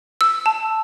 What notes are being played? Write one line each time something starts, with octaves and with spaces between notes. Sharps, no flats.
E6
A5